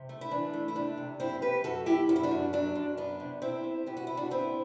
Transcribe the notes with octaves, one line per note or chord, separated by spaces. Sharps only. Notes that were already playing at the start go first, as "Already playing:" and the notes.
Already playing: C3
A3
E4
E3 D4
A3
E4
C3 D4
C3
F#2 C4 E4
F#2 G4 B4
F#2 F#4 A4
F#2 E4 G4
F#2 F#4
E4
D4 F#4
F#2
F#3 D4
F#2
B3 D4
C3
C3 C4 E4
C3
B3 G4
F#4
C3 E4
D4 F#4
B3 C4 E4